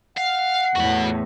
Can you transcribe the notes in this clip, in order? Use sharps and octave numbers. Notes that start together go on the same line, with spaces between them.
F5 F#5
E2 A2 F#4 B5